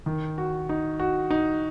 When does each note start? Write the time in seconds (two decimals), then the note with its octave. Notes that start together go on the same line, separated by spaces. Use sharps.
0.06 D#3
0.38 F#4
0.69 D#4
1.00 F#4
1.30 D#4